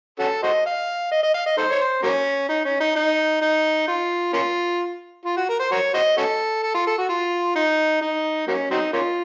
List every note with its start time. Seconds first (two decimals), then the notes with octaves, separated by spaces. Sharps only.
0.19 C#4 F#4 A4
0.43 F#4 C5 D#5
0.66 F5
1.12 D#5
1.23 D#5
1.34 F5
1.46 D#5
1.58 D#4 A4 C5
1.69 C#5
1.81 C5
2.03 F#3 A#3 C#4
2.49 D#4
2.65 C#4
2.80 D#4
2.95 D#4
3.41 D#4
3.88 F4
4.33 A#3 C#4 F4
5.25 F4
5.37 F#4
5.49 A#4
5.60 C5
5.72 F#4 A#4 C#5
5.94 F#4 C5 D#5
6.18 C#4 F#4 A4
6.63 A4
6.74 F4
6.87 A4
6.98 F#4
7.09 F4
7.55 D#4
8.01 D#4
8.48 F#3 A#3 C#4
8.71 F#3 C4 D#4
8.93 A#3 C#4 F4